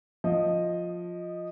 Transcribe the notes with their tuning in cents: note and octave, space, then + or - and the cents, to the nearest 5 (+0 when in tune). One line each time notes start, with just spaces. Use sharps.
F3 +10 D#5 +0